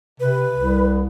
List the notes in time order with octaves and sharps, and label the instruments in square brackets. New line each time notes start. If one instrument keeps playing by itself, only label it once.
[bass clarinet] C3 [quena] B4
[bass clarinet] C2